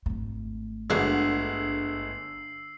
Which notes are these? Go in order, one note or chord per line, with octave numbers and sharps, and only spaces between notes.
G#1 A3
G1 D3 G#3 F#4 E6 C7